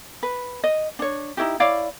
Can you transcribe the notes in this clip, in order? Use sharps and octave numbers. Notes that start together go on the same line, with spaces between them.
B4
D#5
D4 C#5
D#4 E4 F#4 G4
E4 C#5 D5 F5